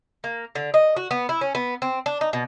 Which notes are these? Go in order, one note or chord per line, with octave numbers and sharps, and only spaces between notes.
A#3
D3
D#5
F#4
B3
E4
C#4
B3
C4
D4
D#4
B2